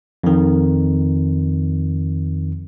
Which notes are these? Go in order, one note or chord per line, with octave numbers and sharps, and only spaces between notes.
F2 D#3